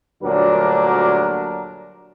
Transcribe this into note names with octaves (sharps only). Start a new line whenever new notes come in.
D2 A#2 F#3 G3 D4 A#4